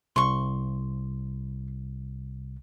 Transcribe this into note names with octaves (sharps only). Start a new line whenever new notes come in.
C2 C6 C#6